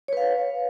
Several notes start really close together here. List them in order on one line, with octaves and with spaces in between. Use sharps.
C#5 B4 F5